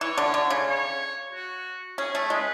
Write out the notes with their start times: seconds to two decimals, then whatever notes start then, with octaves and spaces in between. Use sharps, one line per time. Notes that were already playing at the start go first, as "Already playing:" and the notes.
0.01 E3 C#5
0.18 D3
0.34 D3
0.50 C#3
0.68 C#5
1.32 F#4
1.98 C#4 G#4
2.15 A3
2.30 G#3 B4